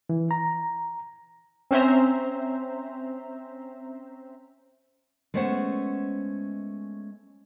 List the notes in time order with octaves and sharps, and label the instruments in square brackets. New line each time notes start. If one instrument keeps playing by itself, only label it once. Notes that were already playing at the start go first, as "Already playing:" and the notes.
[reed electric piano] E3
A#5
[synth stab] C4 C#4 C5 E5 A#5
[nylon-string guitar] G#3 A3 B3 C#4 C5 F#5